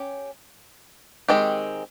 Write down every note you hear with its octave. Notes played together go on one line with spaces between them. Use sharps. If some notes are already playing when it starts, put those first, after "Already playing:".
Already playing: C#4 G4
D#3 G#3 C4 G4